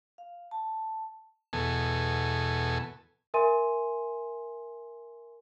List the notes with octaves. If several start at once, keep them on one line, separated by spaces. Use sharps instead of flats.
F5
A5
E2 B2 A4 G#5
A#4 E5 G#5 C6 D#7